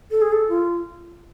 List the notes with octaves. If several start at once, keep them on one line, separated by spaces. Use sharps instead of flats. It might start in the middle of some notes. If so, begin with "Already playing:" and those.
A4
G#4
A4
F4